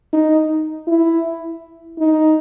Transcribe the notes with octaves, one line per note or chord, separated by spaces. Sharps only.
D#4
E4
D#4